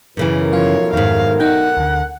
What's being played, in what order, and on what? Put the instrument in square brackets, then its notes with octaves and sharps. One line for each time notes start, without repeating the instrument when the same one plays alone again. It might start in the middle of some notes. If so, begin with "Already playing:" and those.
[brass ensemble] B1 A2 A#4 [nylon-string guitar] F#2 C#3 E3
[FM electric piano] F3 F4 F5 [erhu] C#5
[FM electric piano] F2 [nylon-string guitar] G#2 D#3 [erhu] F5
[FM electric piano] D#4 G6 [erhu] F#5 [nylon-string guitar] G5
[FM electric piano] D2 D3